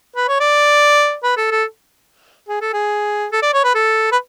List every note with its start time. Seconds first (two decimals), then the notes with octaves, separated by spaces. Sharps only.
0.16 B4
0.28 C#5
0.40 D5
1.24 B4
1.37 A4
1.51 A4
2.48 G#4
2.61 A4
2.73 G#4
3.32 A4
3.42 D5
3.53 C#5
3.64 B4
3.74 A4
4.12 B4